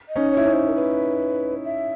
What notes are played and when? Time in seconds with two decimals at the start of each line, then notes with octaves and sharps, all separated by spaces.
0.09 D#5
0.16 C#4 D#4
0.31 C#5
0.37 E4
0.45 C#4 D#4
0.53 C5
0.68 A#4
0.75 B4
1.64 E5